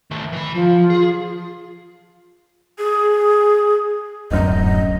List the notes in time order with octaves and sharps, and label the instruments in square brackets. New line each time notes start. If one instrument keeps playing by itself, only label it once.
[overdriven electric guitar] D#3 A3
E3 B5
[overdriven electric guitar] F3 [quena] F4
[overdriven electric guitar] G#4
[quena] G#4
[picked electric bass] D1 F#2 [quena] D#5